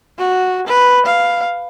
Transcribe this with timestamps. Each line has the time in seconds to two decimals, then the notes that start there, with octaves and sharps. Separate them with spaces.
0.18 F#4
0.67 B4
1.06 F5